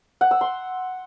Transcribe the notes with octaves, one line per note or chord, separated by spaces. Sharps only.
F#5
E6
C6